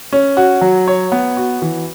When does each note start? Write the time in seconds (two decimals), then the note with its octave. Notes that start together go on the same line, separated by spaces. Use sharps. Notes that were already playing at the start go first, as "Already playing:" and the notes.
0.12 C#4
0.37 F#4
0.61 F#3
0.88 C#5
1.12 B3
1.37 F#4
1.62 E3